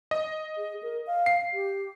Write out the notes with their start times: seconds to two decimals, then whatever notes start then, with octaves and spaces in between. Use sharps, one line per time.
0.11 D#5
0.57 G#4
0.83 A#4
1.07 F5
1.26 C7
1.53 G4